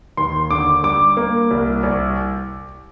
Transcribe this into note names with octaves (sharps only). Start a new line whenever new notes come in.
D#2 C6
D3 D6
G3 D6
A#3
C2
C2